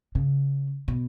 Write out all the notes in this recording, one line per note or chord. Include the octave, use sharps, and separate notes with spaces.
C#3
B2